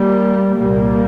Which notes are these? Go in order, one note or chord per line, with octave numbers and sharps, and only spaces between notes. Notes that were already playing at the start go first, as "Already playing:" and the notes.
Already playing: G3 A#3
C2 A#2 G3 A#3